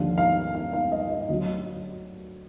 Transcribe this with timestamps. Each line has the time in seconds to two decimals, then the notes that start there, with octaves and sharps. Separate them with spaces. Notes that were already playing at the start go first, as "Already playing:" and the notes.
Already playing: D#2 D3 F3 F5
0.18 F5
0.55 F5
0.73 F5
0.92 D#5
1.11 D#5
1.29 D2 D3 F#3 D#5